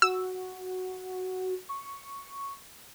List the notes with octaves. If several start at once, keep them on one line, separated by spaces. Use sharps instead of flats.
F#4 E6
C#6